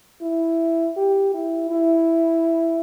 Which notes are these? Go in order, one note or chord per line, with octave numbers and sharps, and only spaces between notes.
E4
G4
E4
E4